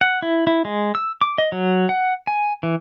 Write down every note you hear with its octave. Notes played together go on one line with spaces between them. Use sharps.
F#5
E4
E4
G#3
E6
D6
D#5
F#3
F#5
G#5
E3